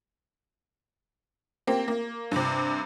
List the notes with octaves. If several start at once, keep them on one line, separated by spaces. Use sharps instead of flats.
A#3 C4 G4
A#3
G2 C3